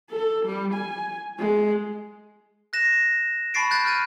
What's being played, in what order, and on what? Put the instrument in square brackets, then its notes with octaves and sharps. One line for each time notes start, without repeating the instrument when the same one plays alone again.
[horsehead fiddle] A4
G3
G#5
G#3
[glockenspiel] F#6 A#6 E7
A5 B5 C#6 A6 C7 D7
F#6 G6 A6
F6 G6 A6 D#7